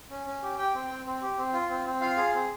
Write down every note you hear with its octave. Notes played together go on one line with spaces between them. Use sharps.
C#4
C#4
G4
G4 G5
C4
C4
C4
G4
C4
F4
C4
C4
F4 F5
G#4
C4